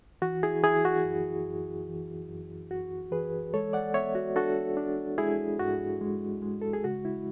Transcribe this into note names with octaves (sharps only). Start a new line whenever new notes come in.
E3 F#4
E4 G#4
E3 E4 G#4
F#4
F#2
F#2
E3
F#2
F#2 F#4
E3 G#4 B4
G#3 A4 C#5
D5 F#5
B3 C#5 E5
F#4
D4 F#4 A4
D4
G#3 E4 G#4
G#2 F#4
G#3
G#3
A4
G#4
C#3 F#4
E4